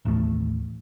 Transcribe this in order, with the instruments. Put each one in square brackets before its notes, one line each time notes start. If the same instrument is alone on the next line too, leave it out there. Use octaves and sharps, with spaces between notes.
[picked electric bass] A1 D#2 A3